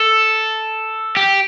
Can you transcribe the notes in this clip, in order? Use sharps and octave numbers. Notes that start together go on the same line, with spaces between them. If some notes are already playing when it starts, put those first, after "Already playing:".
Already playing: A4
G4